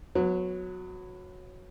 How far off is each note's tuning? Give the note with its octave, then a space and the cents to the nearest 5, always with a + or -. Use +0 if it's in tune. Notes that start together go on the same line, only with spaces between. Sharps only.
F#3 -15 B3 +15